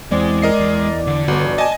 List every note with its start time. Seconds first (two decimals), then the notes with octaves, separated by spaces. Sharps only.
0.11 E2 G#3 C4 D5
0.42 A#4 D#5 C7
0.60 E2
1.07 D3
1.28 G1 B3 F#4
1.58 D#5 G#5 A5